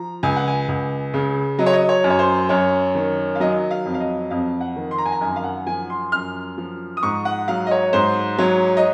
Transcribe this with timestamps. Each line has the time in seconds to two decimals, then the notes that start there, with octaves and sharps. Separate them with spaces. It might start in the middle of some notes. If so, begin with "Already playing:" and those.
Already playing: F3 A#5
0.23 C#2 G#5
0.36 F#5
0.48 G#5
0.68 C#2
1.14 C#3
1.59 F#3 D#5
1.66 C#5
1.73 D#5
1.89 C#5
2.04 F#2
2.10 C#5
2.19 C5
2.49 F#2 C#5
2.95 D#3
3.35 F5
3.40 F#3 D#5
3.71 F5
3.86 F2
3.94 F5
4.00 D#5
4.30 F2 F5
4.61 F#5
4.76 D#3
4.91 C6
4.98 A#5
5.06 G#5
5.12 A#5
5.21 F#2 G#5
5.36 F5
5.44 F#5
5.67 F3 G#5
5.90 C6
6.12 F#2 F6
6.58 F3
6.97 D#6
7.03 G#2 C#6
7.25 F#5
7.48 F#3 F5
7.67 D#5
7.71 C#5
7.93 G#2 C5
8.38 F#3 C#5
8.77 D#5